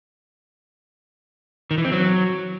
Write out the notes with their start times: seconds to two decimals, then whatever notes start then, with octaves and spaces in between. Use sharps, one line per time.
1.71 D#3
1.78 E3
1.85 C4
1.92 F#3